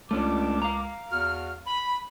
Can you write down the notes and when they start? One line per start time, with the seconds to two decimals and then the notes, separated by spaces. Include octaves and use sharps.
0.11 C#2 A3 C#4 D4 D6
0.62 F5 A#5
1.11 E2 F#4 F6
1.66 B5